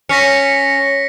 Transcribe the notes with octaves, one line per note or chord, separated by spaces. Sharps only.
C#4 A#6 B6 C#7